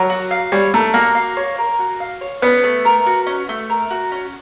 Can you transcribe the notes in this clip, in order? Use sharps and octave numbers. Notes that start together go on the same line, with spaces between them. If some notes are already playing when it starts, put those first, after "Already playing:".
Already playing: F#3 A#4
F#4
F5
G3 C#5
A3 A#4
A#3 F#4
F5
C#5
A#4
F#4
F5
C#5
B3 C#4
A3
A#4
F#4
C#4
A3
A#4
F#4
C#4